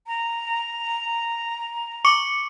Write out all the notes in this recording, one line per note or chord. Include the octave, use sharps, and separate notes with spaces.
A#5
C#6 D6 C#7